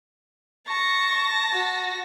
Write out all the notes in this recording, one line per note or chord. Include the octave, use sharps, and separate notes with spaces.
A5 C#6 A#6
F#4